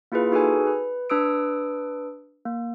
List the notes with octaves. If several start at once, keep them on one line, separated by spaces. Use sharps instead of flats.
A#3 E4 F4 G#4 B4
D#4 F#4 G#4 A4 B4 G#5
B4
D4 B4 D#6 E6 D7
A#3